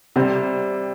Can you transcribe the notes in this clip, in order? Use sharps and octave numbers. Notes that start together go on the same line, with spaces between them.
C3 G3 C4